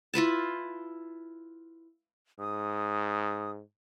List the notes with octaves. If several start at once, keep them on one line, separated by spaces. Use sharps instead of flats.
E4 F4 B4 A5
G#2 D#6